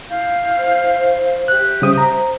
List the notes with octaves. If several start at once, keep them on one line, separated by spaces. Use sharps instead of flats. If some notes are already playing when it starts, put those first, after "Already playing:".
E4 F5 G6
C5
G4 E5 F#6
C#3 G3 C5 D#6
A#5